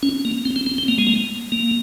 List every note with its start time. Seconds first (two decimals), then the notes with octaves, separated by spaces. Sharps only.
0.03 C#4
0.25 A#3
0.45 C4
0.56 C4
0.66 C4
0.78 C4
0.88 A#3
0.98 G#3
1.07 A#3
1.52 A#3